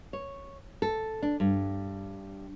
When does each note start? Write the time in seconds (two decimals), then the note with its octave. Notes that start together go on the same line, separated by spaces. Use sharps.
0.13 C#5
0.82 A4
1.22 D4
1.40 G2